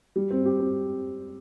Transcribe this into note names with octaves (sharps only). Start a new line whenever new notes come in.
G3
C4
G4
C4